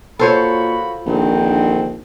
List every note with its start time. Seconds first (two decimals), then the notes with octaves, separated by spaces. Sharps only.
0.19 A#2 F4 F#4 A4 C5 C#5 B5
1.06 A#1 D3 D#3 C4